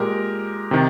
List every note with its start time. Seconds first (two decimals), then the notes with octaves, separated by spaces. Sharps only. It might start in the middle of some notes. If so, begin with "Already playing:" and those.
Already playing: A#2 G#3 G4 A#4
0.71 C3 D#3